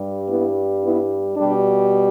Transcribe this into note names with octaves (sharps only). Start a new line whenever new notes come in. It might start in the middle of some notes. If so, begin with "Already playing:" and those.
Already playing: G2 G3
B3 E4
B3 E4
B2 G3 D4 G4